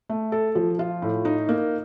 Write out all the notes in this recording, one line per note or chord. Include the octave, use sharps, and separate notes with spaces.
A3
A4
F3
F4
A2
D#4
A#3